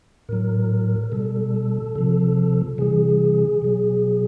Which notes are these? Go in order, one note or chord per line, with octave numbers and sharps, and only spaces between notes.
A2 F#3 A#4
B2 G3 A4
C3 F3
C3 E3 G3 G#4
B2 F#3